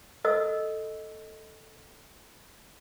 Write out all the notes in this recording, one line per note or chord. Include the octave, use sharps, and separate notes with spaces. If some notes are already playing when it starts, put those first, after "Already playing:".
A4 D#5 E6